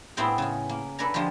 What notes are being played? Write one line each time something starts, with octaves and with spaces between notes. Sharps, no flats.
A2 A3 B3 C4 G#4 G5
C#3 C#4
A#3
A4 B4 D5 F#5 G#5 A#5
D3 F3 G#3 F4 G4